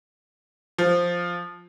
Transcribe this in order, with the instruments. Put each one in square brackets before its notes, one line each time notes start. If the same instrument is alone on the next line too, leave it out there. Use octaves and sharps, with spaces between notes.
[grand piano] F3